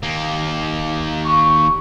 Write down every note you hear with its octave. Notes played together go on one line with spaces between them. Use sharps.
D#2 A#3
C#6